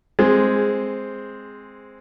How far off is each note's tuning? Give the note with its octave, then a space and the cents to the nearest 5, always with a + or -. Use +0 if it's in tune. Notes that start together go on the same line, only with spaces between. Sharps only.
G#3 +0 C4 +0 G#4 -15